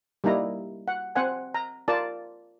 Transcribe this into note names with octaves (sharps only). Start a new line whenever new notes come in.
G3 A#3 D#4 E4 A#5
F#5
C4 C5 F#5 G#5
A#5
F4 A#4 D5 A5